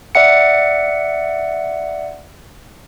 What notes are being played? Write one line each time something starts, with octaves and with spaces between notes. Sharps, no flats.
D5 E5 F#5 C#7